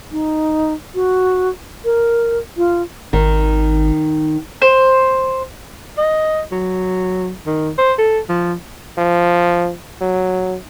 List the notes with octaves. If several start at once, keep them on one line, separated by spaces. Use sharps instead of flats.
D#4
F#4
A#4
F4
G#1 D#3
C5
D#5
F#3
D#3
C5
A4
F3
F3
F#3